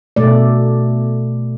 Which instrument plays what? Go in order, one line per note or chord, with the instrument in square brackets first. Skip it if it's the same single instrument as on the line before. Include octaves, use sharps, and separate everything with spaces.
[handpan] B2 A3 D5